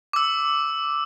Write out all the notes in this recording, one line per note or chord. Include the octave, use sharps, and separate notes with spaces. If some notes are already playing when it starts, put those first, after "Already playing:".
D6 E6